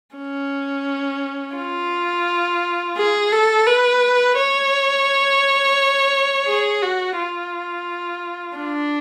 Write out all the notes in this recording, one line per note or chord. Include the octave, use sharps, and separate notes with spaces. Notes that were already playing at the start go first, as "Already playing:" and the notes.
C#4
F4
G#4
A4
B4
C#5
G#4
F#4
F4
D4